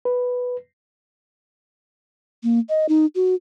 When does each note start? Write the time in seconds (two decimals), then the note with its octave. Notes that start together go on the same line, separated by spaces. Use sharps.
0.05 B4
2.43 A#3
2.69 D#5
2.89 D#4
3.15 F#4